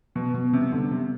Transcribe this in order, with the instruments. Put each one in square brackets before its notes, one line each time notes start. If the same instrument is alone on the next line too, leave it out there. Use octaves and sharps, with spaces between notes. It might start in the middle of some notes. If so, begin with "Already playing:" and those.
[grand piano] B2 [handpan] B3
[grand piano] B2 [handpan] B3
[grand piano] C3 [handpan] G3
[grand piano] D3 [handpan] G3
[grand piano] C3 [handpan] G3